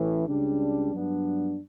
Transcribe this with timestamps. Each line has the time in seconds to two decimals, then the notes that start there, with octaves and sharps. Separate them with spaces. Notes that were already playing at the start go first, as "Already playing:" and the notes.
Already playing: A1 A2 E3
0.28 C#2 C#3 G3 D4
0.94 G2 F#3 B3 D4